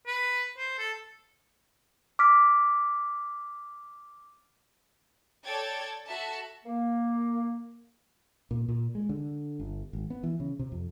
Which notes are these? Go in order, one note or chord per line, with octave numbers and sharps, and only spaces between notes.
B4
C5
A4
D6 F6 B6
A4 C#5 D5 G5 G#6 A6
F#4 A4 E5 A5
A#3
A#2
A#2
G#3
D3
G1
G#1
B3
E3
C#3
C3
F2